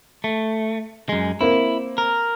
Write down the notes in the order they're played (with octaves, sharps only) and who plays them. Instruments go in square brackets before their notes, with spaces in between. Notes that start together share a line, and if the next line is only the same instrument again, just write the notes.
[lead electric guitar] A3
F#2 G#3
[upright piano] A#3 C4 [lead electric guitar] E4
[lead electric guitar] A#4